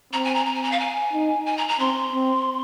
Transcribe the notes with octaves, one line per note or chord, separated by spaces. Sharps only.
C4 A#5
G#5
A#5
A#5
G#5
A#5
F5
G#5
D#4
G#5
A#5
A#5
C4 C6
C4